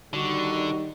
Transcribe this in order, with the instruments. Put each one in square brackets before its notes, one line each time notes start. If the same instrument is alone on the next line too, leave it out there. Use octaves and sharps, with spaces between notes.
[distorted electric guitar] D3 [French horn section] D#3 G3 D#4 [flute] F#4